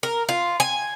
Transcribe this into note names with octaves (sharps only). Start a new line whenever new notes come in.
A#4
F4
G#5